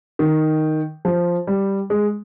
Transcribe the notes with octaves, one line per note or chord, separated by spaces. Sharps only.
D#3
F3
G3
G#3